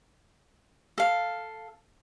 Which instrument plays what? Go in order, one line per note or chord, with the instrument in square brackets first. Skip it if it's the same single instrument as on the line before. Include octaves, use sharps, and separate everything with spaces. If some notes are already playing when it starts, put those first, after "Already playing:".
[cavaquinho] A4 F5